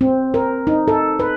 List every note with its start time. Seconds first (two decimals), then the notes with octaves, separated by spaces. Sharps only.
0.01 C4
0.34 A#4
0.67 D#4
0.88 A4
1.19 B4